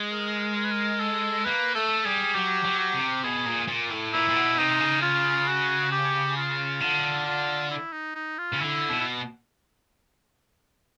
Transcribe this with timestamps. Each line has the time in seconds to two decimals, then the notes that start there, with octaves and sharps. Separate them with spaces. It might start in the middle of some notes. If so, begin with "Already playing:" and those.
Already playing: G#3
0.12 A#4
0.55 A#4
0.64 B4
0.71 A#4
1.00 A4
1.45 A#3 B4
1.75 A3 A4
2.04 G3 G#4
2.35 F#3 G4
2.65 F#3
2.79 G4
2.94 C3
3.24 B2 G#4
3.46 A#2
3.68 A#2
3.91 A2
4.13 A#2 E4
4.28 A#2
4.35 B2
4.58 C3 D#4
4.80 C#3
5.02 F4
5.48 F#4
5.92 G4
6.37 F4
6.81 D3 F4
7.26 F4
7.70 E4
7.93 D#4
8.15 D#4
8.38 F4
8.52 C#3
8.60 D3 E4
8.89 B2
9.00 E4